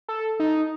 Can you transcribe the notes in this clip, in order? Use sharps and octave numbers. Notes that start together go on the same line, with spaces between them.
A4
D#4